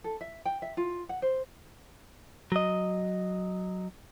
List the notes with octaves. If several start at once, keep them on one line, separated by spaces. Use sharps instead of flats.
A4
E5
G5
E5
F4
F#5
C5
F#3 D#5